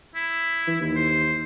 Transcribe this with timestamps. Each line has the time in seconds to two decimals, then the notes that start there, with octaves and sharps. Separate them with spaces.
0.15 E4
0.67 E3
0.81 D#2
0.96 C5